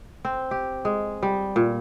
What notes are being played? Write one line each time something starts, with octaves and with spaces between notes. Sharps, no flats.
C4
G4
G#3
G3
A#2